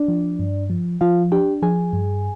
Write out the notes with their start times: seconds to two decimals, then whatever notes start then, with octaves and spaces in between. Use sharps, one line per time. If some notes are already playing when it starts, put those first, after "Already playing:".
Already playing: D4 D5
0.08 F3
0.39 G2
0.70 F3
1.01 F3 F4 F5
1.32 D4 G4 G5
1.62 F3 G#4 G#5
1.93 G2